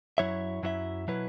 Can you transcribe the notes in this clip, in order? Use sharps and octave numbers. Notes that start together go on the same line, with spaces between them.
F#2 F#3 E4 C#5 E5
F#2 F#3 E4 C#5 E5
B2 F#3 E4 B4